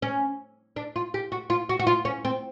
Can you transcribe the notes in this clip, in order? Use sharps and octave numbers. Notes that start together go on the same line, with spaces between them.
C#4
D4
F4
G4
F#4
F4
F#4
F#4
F4
C#4
C4